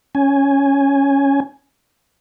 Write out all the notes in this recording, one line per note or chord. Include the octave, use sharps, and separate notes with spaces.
C#4 G#5